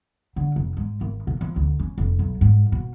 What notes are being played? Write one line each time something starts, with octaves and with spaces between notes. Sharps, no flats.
D3
F1
G#2
G#1
B2
F3
D2
C#4
F1
B1
G#2
B2